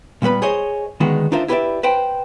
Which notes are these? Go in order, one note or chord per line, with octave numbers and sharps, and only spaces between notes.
A#2 G3 B3 B4 B5
G#4 C5 C#5 D#5
D2 D#3 G#3 B3 F#4
D4 D#4 F4 A#4 C5 E5
E4 G4 B4 C5 D5 E5
B4 C5 G5